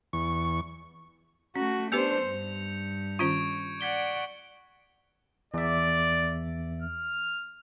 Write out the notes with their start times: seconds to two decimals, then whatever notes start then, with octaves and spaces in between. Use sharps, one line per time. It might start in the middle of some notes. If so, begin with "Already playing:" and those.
0.13 E2 C#6
1.56 A3 C#4 F#4
1.92 B3 D4 G4 B4 C5 G6 C#7 F7
2.24 G2
3.19 D#3 C#4 F4 C#6 G#6 D7
3.81 D5 F#5 G#6 B6 G7
5.54 E2 D5 E5
6.82 F6